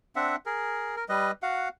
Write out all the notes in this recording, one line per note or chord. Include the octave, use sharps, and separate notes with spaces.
C4 D4 E5 F#5
G#4 A#4
A#4
G3 B4 D#5
F#4 F5 F#5